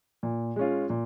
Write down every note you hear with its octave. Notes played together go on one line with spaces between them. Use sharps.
A#2
G#3 C#4 F4
A#2